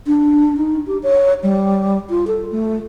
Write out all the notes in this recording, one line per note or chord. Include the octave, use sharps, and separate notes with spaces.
D4
D#4
G4
C#5
G3
F4
A4
A3